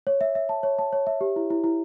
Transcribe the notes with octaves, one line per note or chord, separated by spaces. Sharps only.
C#5
E5
E5
A5
C#5
A5
C#5
E5
G4
E4
E4
E4